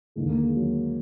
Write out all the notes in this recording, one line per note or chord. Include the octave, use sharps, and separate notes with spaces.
D#2 D3 G#3
A#3
G#3
F#3